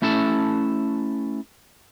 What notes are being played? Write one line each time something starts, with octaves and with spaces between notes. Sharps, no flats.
A3 C#4 E4 A4 A5